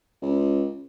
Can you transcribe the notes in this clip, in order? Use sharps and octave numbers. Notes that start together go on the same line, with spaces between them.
C#2